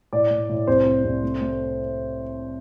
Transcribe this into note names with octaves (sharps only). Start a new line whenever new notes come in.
A2 D5
A2
A2
C2 C5
C2
C2
A3
A3